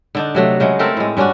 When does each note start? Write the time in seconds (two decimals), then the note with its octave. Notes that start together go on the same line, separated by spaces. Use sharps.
0.15 D3 D4 D#4
0.35 C3 F#3 A3
0.60 C#3 F#3 G#3
0.79 A3 C4 A4 A#4
0.97 A2 G#3
1.17 G2 C#4 D4 F#4